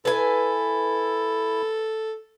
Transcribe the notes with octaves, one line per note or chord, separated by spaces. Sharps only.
E4 A4 B4 G#5